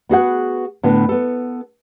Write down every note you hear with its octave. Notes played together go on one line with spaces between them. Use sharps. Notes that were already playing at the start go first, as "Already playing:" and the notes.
B3 F#4 G#4 F#5
A2 D3 B3
B3 A4